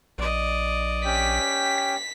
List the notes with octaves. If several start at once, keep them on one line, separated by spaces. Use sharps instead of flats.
A#1 D5 D#5
C#4 G4 G5 B6